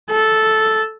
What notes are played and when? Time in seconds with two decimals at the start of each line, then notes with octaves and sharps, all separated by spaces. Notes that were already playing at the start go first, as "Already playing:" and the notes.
0.10 A4